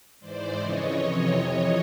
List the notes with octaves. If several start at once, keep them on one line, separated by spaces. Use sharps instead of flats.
G#2 E3 C5 D5
F2 C#3 E3 C#5 D#5
F2 C3 E3 C#5 D#5
F2 C3 E3 C#5 D#5